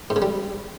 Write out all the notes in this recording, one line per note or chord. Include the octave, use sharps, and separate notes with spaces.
G#2
C#3
G3